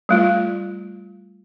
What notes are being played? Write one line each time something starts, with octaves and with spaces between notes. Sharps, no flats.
G3 A3 F4